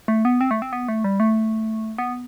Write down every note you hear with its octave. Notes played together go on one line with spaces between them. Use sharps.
A3
B3
C4
A3
C4
B3
A3
G3
A3
B3